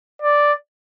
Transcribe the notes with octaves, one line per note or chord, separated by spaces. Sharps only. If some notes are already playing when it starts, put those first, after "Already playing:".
D5